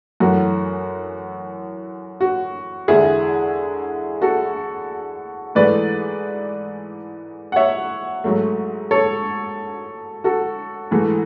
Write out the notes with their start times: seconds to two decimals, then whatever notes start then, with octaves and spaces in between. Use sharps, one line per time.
0.20 F#2 E3 A3 F#4
2.21 F#4
2.88 E2 D3 G#3 E4 G#4
4.22 F#4 A4
5.55 G#2 E3 A3 B4 D5
7.52 F#5
7.56 C#5 E5
8.24 G#2 F#3 A3
8.91 A4 C#5
10.24 F#4 A4
10.91 G#2 E3 A3